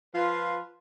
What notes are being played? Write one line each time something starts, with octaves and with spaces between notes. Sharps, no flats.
F3 F4 B4